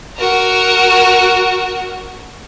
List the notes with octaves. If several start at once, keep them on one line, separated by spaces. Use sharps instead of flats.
F#4 A#4